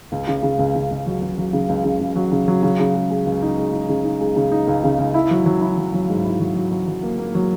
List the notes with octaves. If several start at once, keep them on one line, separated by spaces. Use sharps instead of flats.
C#2
C#3
C#3
C#2
C#3
C#2
F#3
C#2
F#3
C#3
C#2
C#3
C#2
F#3
C#3
F#3
C#3
C#3
G#3
G#3
C#2
D#4
G#3
D#4
C#3
D#4
G#3
C#3
D#4
C#2
C#3
C#2
E4
F#3
F#3
E4
F#3
F#3
G#2
E4
F#3
F#3
F#3
F#3
A#3
A#3
F#3